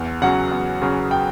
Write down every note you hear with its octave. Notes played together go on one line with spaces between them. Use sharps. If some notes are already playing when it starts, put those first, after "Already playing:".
Already playing: E2
C#3 F#3 F#5
E2
C#3 F#3
G5